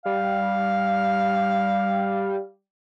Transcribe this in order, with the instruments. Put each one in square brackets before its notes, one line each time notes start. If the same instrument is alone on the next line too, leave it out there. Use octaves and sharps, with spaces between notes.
[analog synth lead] G3 [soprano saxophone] F5